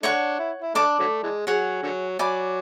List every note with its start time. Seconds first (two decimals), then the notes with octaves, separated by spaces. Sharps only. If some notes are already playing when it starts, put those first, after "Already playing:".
0.03 A3 D4 C#5 F#5 C#6
0.39 E4
0.62 E4
0.75 A3 D4 D5 A5 D6
0.99 D3 F#3 A3
1.23 E3 G#3
1.47 F#3 G#4 C#5 F#5
1.83 D3 F#3
2.19 F#3 D5 G#5 B5 D6